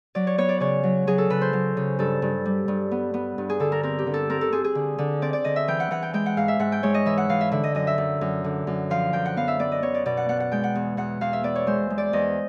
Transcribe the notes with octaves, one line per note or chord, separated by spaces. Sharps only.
F#3 D5
C#5
B3 C#5
D5
C#3 C#5
F#3
F#3 G#4
A4
C#3 B4
C5
F#3
C#3
G2 A4
G2
G3
G2
B3
B3
G2
G#4
D3 A4
A#4
C4 A#4
G4
D3
A4
C4 A#4
A4
C4 G#4
G#4
D3
D3
C4 D5
D5
D3 D#5
E5
E3 G5
F#5
E3 F#5
G5
G#3 G5
F#5
G#2 F5
E5
G#2 F#5
G5
G#3 C#5
D#5
E3 E5
F#5
E3 F5
E5
D3 E5
D#5
F#2 D#5
E5
F#2
F#2
D3
F#2
F3 F5
F#2 G5
F#5
B3 F5
E5
B3 D5
D#5
B3 C#5
D5
B2 D5
F#5
B3 F#5
F#5
G#3 G5
F#5
E2
E2 F#5
E2 F5
E5
B3 D5
C#5
G#3 C5
G#3
D5
E2 D#5